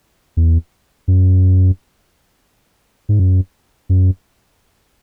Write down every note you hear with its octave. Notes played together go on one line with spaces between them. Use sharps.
E2
F#2
G#2
F#2
F#2